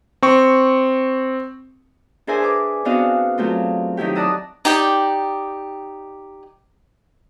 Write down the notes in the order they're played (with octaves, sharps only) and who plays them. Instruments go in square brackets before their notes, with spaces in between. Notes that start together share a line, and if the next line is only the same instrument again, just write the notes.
[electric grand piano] C4 C#6
[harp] D4 G#4 A#4 C5 E5 G#5
B4 D6
B3 C4 D4 F#4 D#5 F5
F#3 A3 C4 F4
D#3 F#3 E4 G4
D5 F#5 A5 A#5 D#6 E6
[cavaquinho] D#4 G4 D5 G5